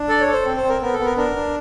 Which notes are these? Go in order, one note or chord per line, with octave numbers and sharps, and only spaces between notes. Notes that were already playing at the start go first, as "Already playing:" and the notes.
Already playing: D4
A4 D5
C#5
A4
C5
C4
C5
C4
A#4
B3 A#4
A4
B3
A#4
D4 A#4
D4